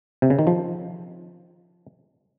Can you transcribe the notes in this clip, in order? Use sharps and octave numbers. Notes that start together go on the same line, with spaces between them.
C3
C#3
D#3
F3